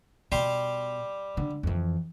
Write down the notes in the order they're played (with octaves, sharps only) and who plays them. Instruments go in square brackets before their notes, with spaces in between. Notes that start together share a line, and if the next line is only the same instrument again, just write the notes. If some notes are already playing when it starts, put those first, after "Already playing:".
[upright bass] B2 [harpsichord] G3 G4 C6
[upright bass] D3
F2 E3